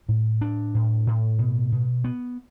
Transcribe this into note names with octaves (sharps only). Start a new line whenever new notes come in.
A2
D4
A2
A2
B2
B2
B3